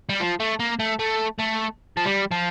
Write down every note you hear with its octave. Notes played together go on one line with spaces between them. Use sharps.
G3
F3
A3
A#3
A3
A3
A3
F3
G3
F3